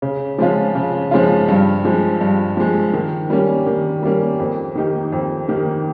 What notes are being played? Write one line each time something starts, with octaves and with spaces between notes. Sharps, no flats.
C#3
F3 G#3 C#4 F4
C#3
F3 G#3 C#4 F4
G2
F3 G#3
G2
F3 G#3
D#3
G3 A#3 C#4
D#3
G3 A#3 C#4
F2
D#3 A#3 D#4 G4
F2
D#3 A#3 D#4 G4